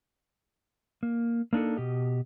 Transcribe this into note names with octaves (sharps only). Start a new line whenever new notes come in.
A#3
A#3 D4 D#4 A4
B2 G4 D#5